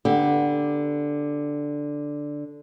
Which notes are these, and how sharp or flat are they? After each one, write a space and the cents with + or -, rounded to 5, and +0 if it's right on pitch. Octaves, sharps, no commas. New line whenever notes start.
D3 +0 B3 -15 G4 +0